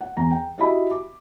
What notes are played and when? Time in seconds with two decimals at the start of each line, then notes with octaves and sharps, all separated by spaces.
0.01 F#5
0.17 E2 A#5
0.31 G5
0.58 E4 F#4 G4 D#5 E5 B5
0.91 D6